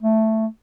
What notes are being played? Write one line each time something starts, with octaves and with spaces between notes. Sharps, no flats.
A3